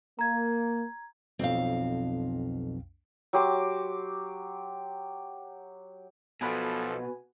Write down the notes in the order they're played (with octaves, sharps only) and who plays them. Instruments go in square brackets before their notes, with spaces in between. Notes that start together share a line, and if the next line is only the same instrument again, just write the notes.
[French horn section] A#3 [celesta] A#5 G#6
[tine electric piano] B1 F2 [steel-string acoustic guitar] C4 F5
[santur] F#3 G4 C6 D6
[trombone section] B1 F3 A4 [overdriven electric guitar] B2 [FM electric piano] F#4 B4 G#5